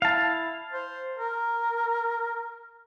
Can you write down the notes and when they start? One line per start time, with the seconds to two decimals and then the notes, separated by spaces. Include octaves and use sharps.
0.02 E4 F5 A5
0.72 C5
1.18 A#4